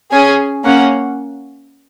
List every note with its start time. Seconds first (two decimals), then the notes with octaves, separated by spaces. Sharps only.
0.12 C#4 G#4 G#5
0.65 A#3 C#4 F#5